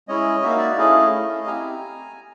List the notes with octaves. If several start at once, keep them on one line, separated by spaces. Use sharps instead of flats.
G#3 C#4 E4 G#4 C#5 D#5
A#3 D#4 F#4 E5
F5
D5 E5
E5
A3 C#4 E4 G#4 D#5 F5
A3 C#4 E4
C4 E4 G4 G#5 A#5